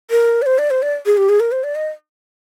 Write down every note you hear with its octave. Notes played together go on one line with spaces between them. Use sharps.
A#4
D5
C5
D5
C5
D5
G#4
G4
G#4
A#4
C5
D5
D#5